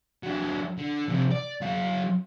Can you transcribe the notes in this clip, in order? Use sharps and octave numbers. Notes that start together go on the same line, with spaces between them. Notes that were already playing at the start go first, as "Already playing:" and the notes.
F#3 D4
D3
F2 C3
D5
F#2 F5